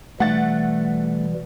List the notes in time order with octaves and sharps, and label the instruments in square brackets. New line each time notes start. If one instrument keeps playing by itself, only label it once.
[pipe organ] B2 E3 G3 [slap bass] A3 [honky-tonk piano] F#5 A6